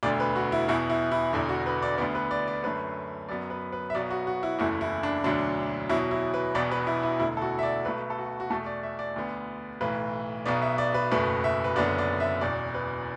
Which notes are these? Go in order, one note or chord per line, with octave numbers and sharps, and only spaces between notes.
E1 D2 D3 D5
B4
F#4
E4
E2 B2 B3 E4
E4
E4
E1 E2 D3 E4
F#4
B4
D5
D2 D3 B3 D5
B4
D5
D5
F#2 D3 A3 B4
F#2 F#3 B3 D5
B4
B4
E5
B1 B2 F#3 B3 D5
F#4
F#4
E4
F#1 E2 E3 A3 E4
E4
D4
E1 D2 D3 F#3 D4
E2 B2 F#3 E4
E4
B4
E1 E2 B2 B3 D5
B4
E4
E4
E1 D2 D3 E4
A4
F#4
E5
D5
B1 B2 A3 B4
A4
F#4
F#4
E2 B2 A3 A4
D5
E5
D5
D2 D3 B3
B1 A2 E3 B4
B1 B2 B3 D5
E5
D5
B4
F#1 E2 B2 A3 B4
E5
B4
F#1 F#2 D3 B3 D5
D5
E5
E1 E2 B2 D5
B4